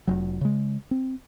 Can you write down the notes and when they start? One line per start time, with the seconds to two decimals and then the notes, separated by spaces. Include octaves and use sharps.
0.07 F1 F#3
0.41 C#3 G#3
0.91 C4